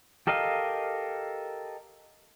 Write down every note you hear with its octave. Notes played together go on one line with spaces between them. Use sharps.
G4 A4 A#4 D#5 F5